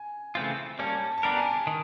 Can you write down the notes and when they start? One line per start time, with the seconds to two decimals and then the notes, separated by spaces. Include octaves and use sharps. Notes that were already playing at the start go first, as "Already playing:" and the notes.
Already playing: G#5
0.35 C#3 E3 A3 C4 F4
0.79 G3 A#3 C#4 A5
1.02 A5
1.18 A5
1.23 B3 D4 G4 A#4 A#5
1.37 G#5
1.46 A5
1.67 D#3